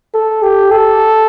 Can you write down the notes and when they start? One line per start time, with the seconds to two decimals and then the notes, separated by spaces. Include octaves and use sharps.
0.14 A4
0.42 G4
0.71 A4